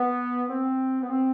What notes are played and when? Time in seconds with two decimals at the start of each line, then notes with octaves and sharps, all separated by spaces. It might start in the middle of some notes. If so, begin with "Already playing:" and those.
Already playing: B3
0.49 C4
1.01 B3
1.09 C4